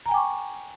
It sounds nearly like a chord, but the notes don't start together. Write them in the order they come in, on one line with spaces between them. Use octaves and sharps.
A#5 G#5 G5 D6 C#6